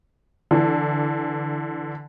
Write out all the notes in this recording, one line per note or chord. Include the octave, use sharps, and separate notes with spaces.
D3 E3